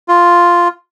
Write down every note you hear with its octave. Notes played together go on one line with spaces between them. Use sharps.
F4